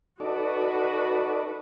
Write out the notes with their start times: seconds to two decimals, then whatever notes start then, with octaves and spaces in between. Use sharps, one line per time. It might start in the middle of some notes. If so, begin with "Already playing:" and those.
0.20 D#4 F#4 A4 B4 D5